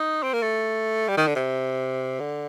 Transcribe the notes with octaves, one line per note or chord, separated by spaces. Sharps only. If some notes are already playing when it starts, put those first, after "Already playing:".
Already playing: D#4
C4
A#3
A3
G3
D#3
D3
C3
D3